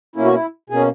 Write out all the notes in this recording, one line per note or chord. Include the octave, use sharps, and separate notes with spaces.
B2 A#3 C#4 E4
F#4
E4
B2 A#3 C#4 G#4